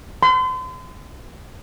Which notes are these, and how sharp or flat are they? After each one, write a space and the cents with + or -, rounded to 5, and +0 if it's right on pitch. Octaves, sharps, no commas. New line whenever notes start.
C6 -40